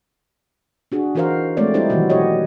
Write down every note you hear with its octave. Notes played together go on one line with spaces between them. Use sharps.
D4 F#4 G#4
E3 D#4 F#4 A#4 C5 F5
G#3 A3 C4 C#5 D5
G3 D#4 E4 G4 C5
B2 D#3 E3 F#3 F#4
B2 F#4 G4 C#5 D#5